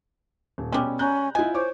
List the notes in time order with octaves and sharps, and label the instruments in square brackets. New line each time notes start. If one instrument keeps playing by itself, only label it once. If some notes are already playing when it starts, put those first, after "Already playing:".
[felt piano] D#1
[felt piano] B2 C#4 [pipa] G3 G#3
[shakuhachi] C#4 [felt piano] A#5 F#6 G6
[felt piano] E4 F4 [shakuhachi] D#5 [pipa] G#5
[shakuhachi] C5 [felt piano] C#5 C#6 D6